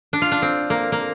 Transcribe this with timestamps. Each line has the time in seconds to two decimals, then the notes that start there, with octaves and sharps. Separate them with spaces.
0.13 D4
0.22 F4
0.32 D4
0.42 C4
0.70 A#3
0.92 A#3